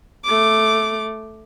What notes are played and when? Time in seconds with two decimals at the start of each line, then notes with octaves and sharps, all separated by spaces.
0.25 A3 D6